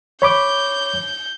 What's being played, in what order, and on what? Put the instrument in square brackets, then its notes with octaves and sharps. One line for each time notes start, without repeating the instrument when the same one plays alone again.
[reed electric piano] C#5 B5 D6 [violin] G6